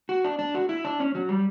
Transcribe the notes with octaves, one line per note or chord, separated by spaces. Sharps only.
F#4
D4
D4
F#4
E4
D4
C#4
F#3
G3